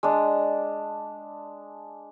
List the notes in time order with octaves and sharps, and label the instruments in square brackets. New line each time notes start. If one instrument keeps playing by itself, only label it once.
[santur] G#3 D4